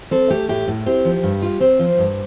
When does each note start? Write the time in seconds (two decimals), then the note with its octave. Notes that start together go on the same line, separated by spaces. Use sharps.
0.11 C4 A4
0.30 A3 G4
0.48 A2 G4
0.68 A2
0.86 C4 G4
1.05 F3
1.23 G2
1.42 F4
1.60 C4 C5
1.79 F3
1.98 G2